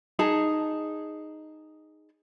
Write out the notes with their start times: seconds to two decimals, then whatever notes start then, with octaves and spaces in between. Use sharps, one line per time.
0.19 D#4 G#4 A5